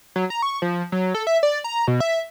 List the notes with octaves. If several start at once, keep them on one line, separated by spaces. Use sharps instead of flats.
F#3
A#5
C#6
F3
F#3
A4
E5
D5
A#5
B2
E5